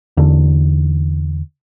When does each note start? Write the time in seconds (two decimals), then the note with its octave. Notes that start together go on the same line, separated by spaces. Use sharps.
0.17 E2 D3